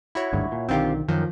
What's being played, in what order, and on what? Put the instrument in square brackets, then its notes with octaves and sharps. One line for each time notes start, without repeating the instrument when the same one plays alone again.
[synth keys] E4 F#4 C#5
[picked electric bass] G#1 D2 G2
A#2
[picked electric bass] B1 D3 D#3 [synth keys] C4 F4 G4
[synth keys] F#2 D#3 [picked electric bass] F3